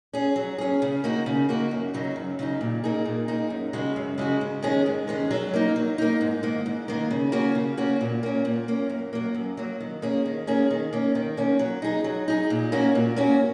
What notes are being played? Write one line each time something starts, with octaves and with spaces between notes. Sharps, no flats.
C#4 G#4
F#3
C#4 G#4
C#3
A#3 D#4 F#4
C#3
A#3 D#4 F#4
F#2
C#3 F#3 D#4
F#2
C#3 F#3 D#4
A#2
A#3 D#4 G#4
A#2
A#3 D#4 G#4
F#2
C#3 G#3 F#4
F#2
C#3 G#3 F#4
G#2
D#3 G#3 C#4 G#4
G#2
D#3 G#3 C#4 G#4
F#3
A#3 D#4
F#3
A#3 D#4
G#2
D#3 A#3
G#2
D#3 A#3
C#3
A#3 C#4 F#4
C#3
A#3 C#4 F#4
A#2
A#3 C#4
A#2
A#3 C#4
F#2
F#3 A#3
F#2
F#3 A#3
D#3
A#3 C#4 G#4
D#3
A#3 C#4 G#4
D#3
A#3 C#4
D#3
A#3 C#4
F#3
D#4 G#4
F#3
D#4 G#4
A#2
A#3 C#4 F#4
A#2
A#3 C#4 F#4